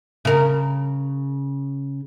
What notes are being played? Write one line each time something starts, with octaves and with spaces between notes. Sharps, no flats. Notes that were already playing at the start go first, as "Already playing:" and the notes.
C#3 A#4